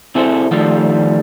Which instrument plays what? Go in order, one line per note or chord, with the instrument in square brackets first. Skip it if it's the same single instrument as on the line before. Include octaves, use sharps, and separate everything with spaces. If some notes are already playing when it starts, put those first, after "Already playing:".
[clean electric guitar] C3 C4 E4 G#4 A4 C5
D#3 F3 G3 A3 D#4 F4